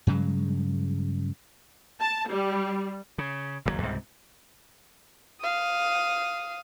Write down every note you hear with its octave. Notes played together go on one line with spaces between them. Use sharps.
G2 C#3 F#3 G#3
A5
G3
C#3
F#1 D#2 A2 F#3
C#2 G#2 C3 G3
F5 D#6